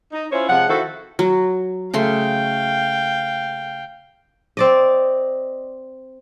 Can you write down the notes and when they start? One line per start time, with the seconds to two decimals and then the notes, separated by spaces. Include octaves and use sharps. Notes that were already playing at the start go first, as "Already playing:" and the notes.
0.13 D#4
0.32 C#4 E4 F4 C5 C#5
0.49 C3 F3 G#3 F#5
0.68 D#3 E4 F#4 A4 C5 E5
1.19 F#3
1.94 C#3 A3 F5 G5 C6
4.57 C4 D5 D#5